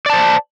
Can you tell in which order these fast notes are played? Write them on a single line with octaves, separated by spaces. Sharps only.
D5 A5 C5